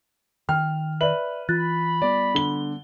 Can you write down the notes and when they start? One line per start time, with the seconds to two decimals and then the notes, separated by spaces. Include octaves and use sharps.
0.49 D#3 G5 F6
1.01 B4 D5 E5 F#7
1.49 E3 F4 B5 F#6 A6
2.02 G3 B3 D5
2.35 D3 G7